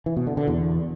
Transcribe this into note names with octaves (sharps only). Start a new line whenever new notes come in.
E3
B2
D3
D3
E2